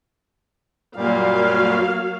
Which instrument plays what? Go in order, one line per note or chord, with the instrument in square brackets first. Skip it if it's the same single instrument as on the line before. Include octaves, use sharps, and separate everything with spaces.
[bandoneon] F#2 A#2 G3 [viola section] F#3 A#3 F5